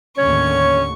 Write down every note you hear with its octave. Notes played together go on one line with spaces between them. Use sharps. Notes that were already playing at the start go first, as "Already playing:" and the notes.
D#2 A2 D3 C#4 C#5 C#6